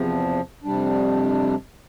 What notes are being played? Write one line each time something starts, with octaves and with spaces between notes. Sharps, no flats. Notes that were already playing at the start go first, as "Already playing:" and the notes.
Already playing: E2 C3 F3
F2 C3 G3 D4